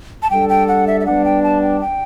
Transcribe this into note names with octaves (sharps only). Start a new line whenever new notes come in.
A5
G3 D4 A4 G5
G5
F#5
E5
E5
G3 B3 D4 F#5
G5
A5
G5
G5